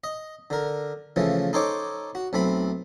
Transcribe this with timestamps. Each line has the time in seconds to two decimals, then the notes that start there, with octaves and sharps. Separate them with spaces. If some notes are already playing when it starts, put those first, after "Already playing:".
0.04 D#5
0.50 D3 A#4
1.16 C#3 E3 F3 A3
1.53 D#4 A4 C5 C#5 G5 D6
2.15 F#4
2.33 B1 A3 C4 B5